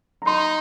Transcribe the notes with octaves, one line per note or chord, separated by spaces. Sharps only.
A#5
D#4 C6